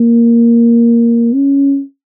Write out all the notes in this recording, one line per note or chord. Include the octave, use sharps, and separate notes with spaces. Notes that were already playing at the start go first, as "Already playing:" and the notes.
Already playing: A#3
C#4